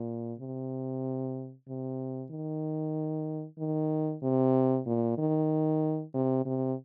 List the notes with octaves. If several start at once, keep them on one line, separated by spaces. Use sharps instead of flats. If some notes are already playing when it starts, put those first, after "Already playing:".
Already playing: A#2
C3
C3
D#3
D#3
C3
A#2
D#3
C3
C3